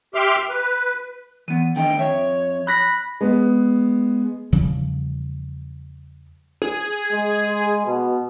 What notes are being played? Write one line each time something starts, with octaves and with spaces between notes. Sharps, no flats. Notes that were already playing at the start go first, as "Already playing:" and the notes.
G4 E5 C6 D6 F6
B4
E3 B3 D#7
D3 D#3 A3 D#4 G5
F2 C#5 E5
B5 F#6 A#6 B6
G#3 B3
E2 C#3 F3 G3
G#4
G#3
B2